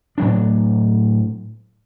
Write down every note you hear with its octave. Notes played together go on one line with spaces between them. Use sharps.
A2 F#3 D4